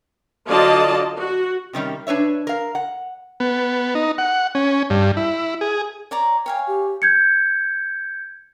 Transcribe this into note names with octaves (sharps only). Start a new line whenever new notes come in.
D3 F#3 F4 D5 D#5 A5
F#4
C3 D#3 G3 C#4
D4 B4 C#5 E5
A#4 F5
F#5
B3
D#4
F#5
C#4
G2
E4
G#4
C#5 D5 A#5
C#5 F5 G5 G#5
G4
G6 G#6 C#7